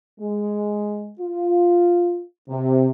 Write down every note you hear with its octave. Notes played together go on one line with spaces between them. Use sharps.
G#3
F4
C3